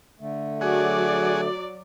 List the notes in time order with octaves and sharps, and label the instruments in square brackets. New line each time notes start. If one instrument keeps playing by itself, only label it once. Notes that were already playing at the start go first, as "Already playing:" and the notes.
[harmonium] D3 A3
[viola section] F#3 D5 [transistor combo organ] F#4 G#4